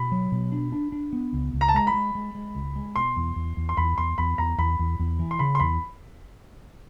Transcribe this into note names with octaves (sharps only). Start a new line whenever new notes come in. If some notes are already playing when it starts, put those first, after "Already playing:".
Already playing: B2 B5
F#3
B2
D4
D4
D4
B3
C#2
C#2
A#5
A5
G#3 A#5
B5
G#3
G#3
G#3
C#2
G#3
B2 C6
E2
E2
E2
C6
E2 B5
E2 C6
E2 B5
E2 A#5
E2 B5
E2
E2
E3
C6
C#3 B5
C6
E2 B5